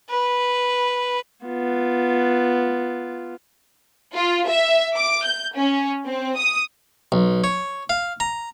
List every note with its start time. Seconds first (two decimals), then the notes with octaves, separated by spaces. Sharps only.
0.10 B4
1.46 B3 F4
4.14 F4
4.48 E5
4.96 D6
5.25 G6
5.57 C#4
6.05 C4
6.37 D#6
7.12 B1
7.44 C#5
7.90 F5
8.20 A#5